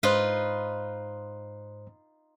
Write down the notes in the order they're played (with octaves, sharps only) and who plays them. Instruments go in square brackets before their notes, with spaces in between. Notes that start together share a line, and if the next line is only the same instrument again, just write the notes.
[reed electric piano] G#2 C5 F#6 [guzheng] D#4 F4 B4